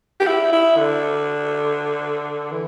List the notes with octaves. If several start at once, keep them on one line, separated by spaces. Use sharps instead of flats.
G4
E4
E4
D3
E3